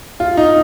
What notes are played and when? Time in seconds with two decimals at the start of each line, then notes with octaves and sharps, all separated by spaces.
0.20 F4
0.37 D#4